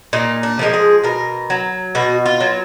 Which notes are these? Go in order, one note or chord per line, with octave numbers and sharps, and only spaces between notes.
A#2 D#4
D4
F3 G#3 A#4
G#4
B2 A#4
F#3
B2 F#4
F4
F#3